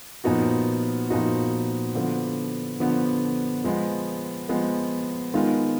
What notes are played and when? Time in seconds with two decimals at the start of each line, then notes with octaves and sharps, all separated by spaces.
0.24 A#2 F3 B3 D#4 F#4
1.10 A#2 F3 B3 D#4 F#4
1.95 D3 F3 B3
2.80 D3 F3 B3
3.64 F3 G#3 B3
4.49 F3 G#3 B3
5.34 D#3 G#3 B3 F4